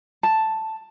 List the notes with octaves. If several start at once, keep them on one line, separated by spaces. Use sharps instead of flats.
A5